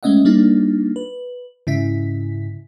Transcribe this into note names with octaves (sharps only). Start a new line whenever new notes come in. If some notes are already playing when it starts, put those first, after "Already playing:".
G#3 A3 C#4 D#5 E5 F#5
G3 A#3 D4 D#4 F4
B4
G#2 C#3 E4 E5 B6